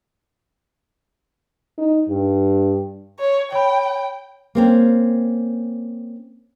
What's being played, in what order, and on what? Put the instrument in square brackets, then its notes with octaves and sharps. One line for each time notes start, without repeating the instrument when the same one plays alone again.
[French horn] D#4
G2
[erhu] C#5
[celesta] C#5 B5 [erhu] G5
[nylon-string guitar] A#3 C4 C#4